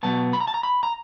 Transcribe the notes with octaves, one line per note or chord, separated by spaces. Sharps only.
B2 F#3 B3 A5
B5
A#5
A5
A#5
B5
A#5